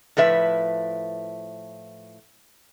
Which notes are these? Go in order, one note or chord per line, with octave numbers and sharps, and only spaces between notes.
A2 F3 B4 E5